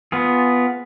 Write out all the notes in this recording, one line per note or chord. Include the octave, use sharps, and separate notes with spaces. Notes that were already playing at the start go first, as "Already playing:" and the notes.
B3 F4 G#4